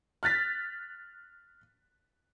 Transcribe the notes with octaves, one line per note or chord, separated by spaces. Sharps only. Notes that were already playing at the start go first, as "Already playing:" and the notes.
F6 F#6 A6 B6